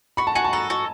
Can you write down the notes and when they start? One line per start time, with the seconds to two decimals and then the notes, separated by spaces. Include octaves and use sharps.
0.17 F#4 B5
0.27 A5
0.35 F#4 G#5
0.44 A5
0.53 A4 A#5
0.70 F#4